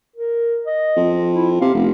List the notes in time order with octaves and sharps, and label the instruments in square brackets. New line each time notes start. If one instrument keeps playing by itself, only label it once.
[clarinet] A#4
D#5
[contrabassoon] F2
[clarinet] E4
[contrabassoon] C3 [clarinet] F5
[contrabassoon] F1 [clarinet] B3